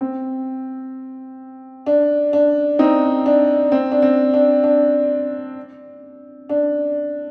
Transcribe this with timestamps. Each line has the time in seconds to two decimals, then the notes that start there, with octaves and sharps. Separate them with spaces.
0.01 C4
1.86 D4
2.33 D4
2.79 C4 D#4
3.26 D4
3.72 C4
3.92 D4
4.02 C4
4.34 D4
4.64 D4
6.49 D4